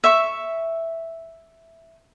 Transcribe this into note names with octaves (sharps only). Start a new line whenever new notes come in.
E5 C#6